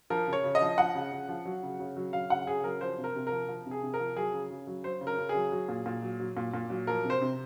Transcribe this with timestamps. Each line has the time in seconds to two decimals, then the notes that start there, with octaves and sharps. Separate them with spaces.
0.10 F3 A#4
0.27 C#3
0.33 C#5
0.44 C#3
0.55 D#5
0.61 F3
0.78 F3 F#5
0.95 C#3
1.12 C#3
1.29 F3
1.46 F#3
1.63 C#3
1.80 C#3
1.97 F#3
2.13 F#3 F5
2.30 C#3 F#5
2.47 C#3 G#4
2.64 F#3 A#4
2.81 F3 C5
2.98 C3
3.04 A#4
3.15 C3
3.27 F3 A#4
3.49 F3
3.66 C3
3.71 G#4
3.83 C3
3.94 A#4
4.00 F3
4.16 F#3 G#4
4.34 C#3
4.50 C#3
4.67 F#3
4.84 F#3 C5
5.01 C#3
5.07 A#4
5.18 C#3
5.29 G#4
5.35 F#3
5.52 F#3
5.69 A#2
5.86 A#2
6.03 F#3
6.20 F#3
6.37 A#2
6.54 A#2
6.70 F#3
6.87 F3 A#4
7.04 C3
7.10 C5
7.21 C3